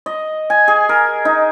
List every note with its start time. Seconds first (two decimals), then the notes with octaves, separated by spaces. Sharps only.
0.06 D#5
0.50 G#5
0.68 G#4
0.89 A#4
1.25 D#4